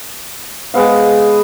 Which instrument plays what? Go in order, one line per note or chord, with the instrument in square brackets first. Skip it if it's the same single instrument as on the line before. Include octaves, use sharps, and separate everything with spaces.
[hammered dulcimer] G#3 B3 F5